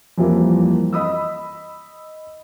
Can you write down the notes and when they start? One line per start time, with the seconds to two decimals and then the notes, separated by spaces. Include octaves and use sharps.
0.18 F2 E3 F3 G3 A#3
0.93 D#5 B5 D#6 E6